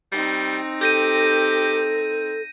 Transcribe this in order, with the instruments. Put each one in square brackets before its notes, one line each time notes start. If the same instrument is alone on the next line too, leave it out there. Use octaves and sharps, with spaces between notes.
[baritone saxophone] G3 [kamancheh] C4 D#4
[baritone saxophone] G4 [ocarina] A4 [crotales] G6 A#6 D#7